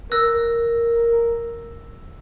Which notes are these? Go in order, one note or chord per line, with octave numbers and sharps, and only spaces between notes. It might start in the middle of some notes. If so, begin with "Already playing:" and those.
A#4 E6 F#6 A#6